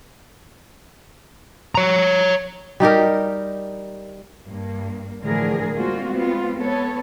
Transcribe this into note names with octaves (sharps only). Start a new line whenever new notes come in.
C#5 A#5
G3 D#4 G4 A#4
G2 A#3
A2 D3 E3 F3 G#4 A#4
G3 G#3 A#3 C4 F4 F#4
G#3 B3 C4 F4
B3 A4 C#5